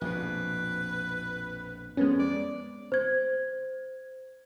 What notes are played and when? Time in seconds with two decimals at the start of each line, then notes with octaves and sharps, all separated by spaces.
0.01 A#1 F2 B2 B4
1.97 F2 G#3 B3 C#4
2.20 D5
2.92 C5 G#6